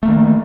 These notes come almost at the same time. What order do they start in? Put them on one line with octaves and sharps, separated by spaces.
A3 A#3 D#3